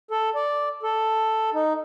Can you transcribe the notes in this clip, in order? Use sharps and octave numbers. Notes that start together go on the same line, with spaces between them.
A4
D5
A4
D#4